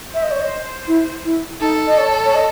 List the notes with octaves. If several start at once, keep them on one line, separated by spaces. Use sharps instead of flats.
C5 E5
D#5
C#5
D#5
E4
E4
D#4 A4
D#5
C#5
C#5
D#5